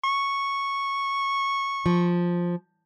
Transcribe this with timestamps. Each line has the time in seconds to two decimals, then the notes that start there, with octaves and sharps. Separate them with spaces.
0.04 C#6
1.86 F3